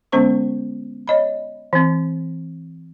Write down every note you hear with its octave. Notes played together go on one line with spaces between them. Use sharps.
D3 G#3 B3 C#4 C5 C#6
C#5 D#5 B5
E3 C4